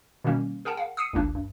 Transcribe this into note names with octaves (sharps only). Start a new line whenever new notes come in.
B2 D#3 G3 A#3 C#4
G#4 A#4 F#5 G5 A5
F5 F#5
D#6 E6 C7 C#7 D#7
G1 C#2 A#3 D4
G2